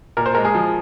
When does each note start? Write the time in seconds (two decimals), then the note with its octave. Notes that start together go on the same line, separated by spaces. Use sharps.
0.17 A#2 A#4
0.26 C5
0.35 G#3 A#4
0.45 G#4
0.55 F3